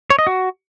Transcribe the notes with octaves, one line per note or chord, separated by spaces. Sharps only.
C#5
D#5
F#4